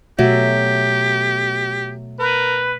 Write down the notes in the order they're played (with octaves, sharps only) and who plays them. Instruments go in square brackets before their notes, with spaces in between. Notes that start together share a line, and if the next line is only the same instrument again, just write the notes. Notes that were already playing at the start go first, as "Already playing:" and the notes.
[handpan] B2 A3 E5 [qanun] F#3 [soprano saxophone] G4
[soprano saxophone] A#4 [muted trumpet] B4